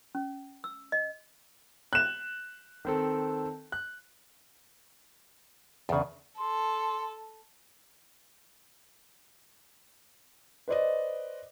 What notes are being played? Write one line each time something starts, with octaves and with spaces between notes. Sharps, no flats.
C#4
E6
D#5
F#6 E7
D#3 C4 A4
F#6
E2 C#3 D4 G#4
A4 C6
B4 C5 D5 D#5